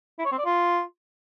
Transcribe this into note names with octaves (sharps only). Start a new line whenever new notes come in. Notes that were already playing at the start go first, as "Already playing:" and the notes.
E4
C#5
C4
D5
F4